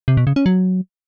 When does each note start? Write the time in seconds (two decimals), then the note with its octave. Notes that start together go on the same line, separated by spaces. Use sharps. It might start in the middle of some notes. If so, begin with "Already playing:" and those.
0.08 C3
0.17 B2
0.27 C#3
0.36 C#4
0.46 F#3